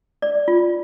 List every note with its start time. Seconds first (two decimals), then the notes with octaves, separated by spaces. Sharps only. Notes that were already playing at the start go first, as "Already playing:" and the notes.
0.22 D5
0.48 F4